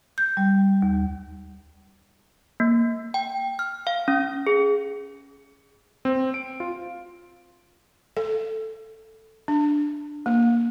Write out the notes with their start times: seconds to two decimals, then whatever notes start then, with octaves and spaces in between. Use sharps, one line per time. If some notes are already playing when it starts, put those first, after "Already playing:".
0.18 G6
0.37 G3
0.82 D#2
2.60 A#3
3.14 G5
3.59 F6
3.87 F5
4.08 C#4
4.47 G#4
6.05 C4
6.34 D7
6.60 F4
8.17 A4
9.48 D4
10.26 A#3